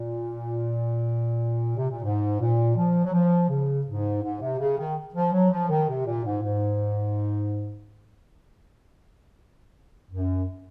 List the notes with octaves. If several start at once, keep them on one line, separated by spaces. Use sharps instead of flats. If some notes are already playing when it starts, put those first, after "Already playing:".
Already playing: A#2
C3
A#2
G#2
A#2
F3
F#3
F3
C#3
G#2
G#2
C3
C#3
D#3
F3
F#3
F3
D#3
C3
A#2
G#2
G#2
F#2